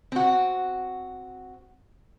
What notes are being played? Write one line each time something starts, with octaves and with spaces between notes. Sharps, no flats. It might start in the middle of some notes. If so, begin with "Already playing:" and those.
C4 F#4